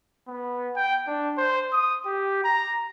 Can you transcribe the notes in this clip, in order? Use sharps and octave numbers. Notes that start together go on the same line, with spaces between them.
B3
G5
D4
C5
D#6
G4
A#5